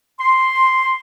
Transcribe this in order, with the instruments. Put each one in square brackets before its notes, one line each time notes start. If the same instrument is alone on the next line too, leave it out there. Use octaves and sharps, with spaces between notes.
[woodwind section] C6